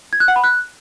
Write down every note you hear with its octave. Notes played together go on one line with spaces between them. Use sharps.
G#6
F#6
F#5
B5
F#6